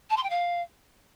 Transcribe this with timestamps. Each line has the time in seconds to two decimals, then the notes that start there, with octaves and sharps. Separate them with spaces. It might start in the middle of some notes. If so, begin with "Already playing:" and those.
0.10 A5
0.16 C6
0.23 G5
0.30 F5